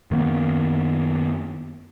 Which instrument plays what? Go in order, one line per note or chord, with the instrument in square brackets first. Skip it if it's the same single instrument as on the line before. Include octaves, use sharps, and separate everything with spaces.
[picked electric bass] F#2 D#3 A#3 B3